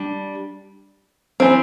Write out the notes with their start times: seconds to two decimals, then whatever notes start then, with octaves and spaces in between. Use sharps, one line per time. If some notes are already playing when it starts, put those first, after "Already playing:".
Already playing: G3 D4
1.40 E3 C4